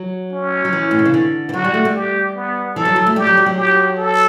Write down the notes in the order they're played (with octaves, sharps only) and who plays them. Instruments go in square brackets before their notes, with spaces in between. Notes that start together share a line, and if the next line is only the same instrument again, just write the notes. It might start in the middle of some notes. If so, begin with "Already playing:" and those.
Already playing: [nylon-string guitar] F#3
[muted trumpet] C#4
[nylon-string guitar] F#3
E3
A2
B2
C#3
D3
E3
[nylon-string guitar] F#3 [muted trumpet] F#4
[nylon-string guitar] G3
A3
G3
[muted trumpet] G4
B3
[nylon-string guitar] E3 [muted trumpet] A4
[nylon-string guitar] F#3
F#3
A3
[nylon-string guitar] G3 [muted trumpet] G4
[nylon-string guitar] F#3
G3
F#3
[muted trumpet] G4
A4